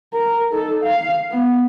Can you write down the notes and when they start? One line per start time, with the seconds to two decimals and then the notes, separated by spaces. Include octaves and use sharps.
0.14 A#4
0.52 D#4 A4
0.84 F5
1.31 B3